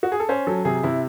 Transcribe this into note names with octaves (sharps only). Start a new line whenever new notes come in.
F#4
G#4
A4
C#4 C5
F#3 A4
C3 G#4
C3 E4